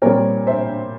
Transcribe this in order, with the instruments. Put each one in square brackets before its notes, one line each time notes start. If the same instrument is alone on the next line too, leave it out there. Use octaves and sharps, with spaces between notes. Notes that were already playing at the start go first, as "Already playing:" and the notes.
[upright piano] A#2 G3 C4 A#4 C#5
C5 E5